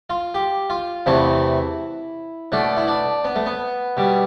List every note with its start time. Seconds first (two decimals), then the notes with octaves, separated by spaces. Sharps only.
0.10 F4
0.34 G4
0.70 F4
1.06 E2 C3 E3 A3 E4
2.52 B2 A3 D4
2.77 E4
2.88 D4
3.24 B3
3.36 A3
3.46 B3
3.97 B2 G3